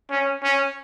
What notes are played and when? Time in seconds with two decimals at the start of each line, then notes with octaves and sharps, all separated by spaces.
0.10 C#4
0.43 C#4